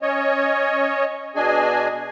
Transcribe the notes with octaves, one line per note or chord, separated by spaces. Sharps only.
C#4 C#5 D#5
B2 D4 G#4 D#5 G#5